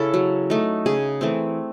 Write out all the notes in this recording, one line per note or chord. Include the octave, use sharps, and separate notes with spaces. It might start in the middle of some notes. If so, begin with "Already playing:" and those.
Already playing: C#3 C#4 E4 A4
F#3
A3 D#4
C#3 G#4
E3 A3 C4